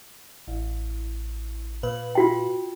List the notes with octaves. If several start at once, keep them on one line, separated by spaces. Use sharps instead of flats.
A1
A#2 B4
F4 F#4 G5